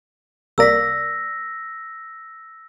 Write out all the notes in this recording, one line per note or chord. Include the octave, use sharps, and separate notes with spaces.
C2 A#3 D5 E6 A#6 B6